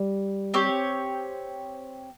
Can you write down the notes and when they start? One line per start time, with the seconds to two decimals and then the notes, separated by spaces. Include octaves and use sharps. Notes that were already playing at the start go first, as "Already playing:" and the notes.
Already playing: G3
0.54 C4 G4 C#5